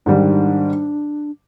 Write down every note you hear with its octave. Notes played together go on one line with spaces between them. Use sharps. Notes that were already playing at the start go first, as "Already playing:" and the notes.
G#2 D#3 G3 D4